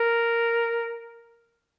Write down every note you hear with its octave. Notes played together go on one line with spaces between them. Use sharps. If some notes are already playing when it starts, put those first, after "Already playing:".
Already playing: A#4